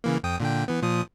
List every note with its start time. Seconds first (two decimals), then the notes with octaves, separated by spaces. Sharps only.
0.04 C#3 E3 A#3
0.23 F2 G5 D#6
0.40 A#2 D3 G5
0.68 E3 B3
0.82 A#2 F3 D#6